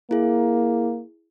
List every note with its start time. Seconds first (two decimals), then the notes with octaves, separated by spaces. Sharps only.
0.11 A#3 E4 G#4